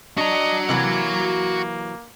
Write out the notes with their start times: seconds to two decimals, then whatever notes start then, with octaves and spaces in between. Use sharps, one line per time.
0.17 D4 F#4 D#5 A#5
0.69 C3 E3 F#3 A#3